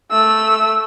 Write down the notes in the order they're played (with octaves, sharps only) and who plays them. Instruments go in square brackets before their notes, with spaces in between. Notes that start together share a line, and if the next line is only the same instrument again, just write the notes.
[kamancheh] A3 E6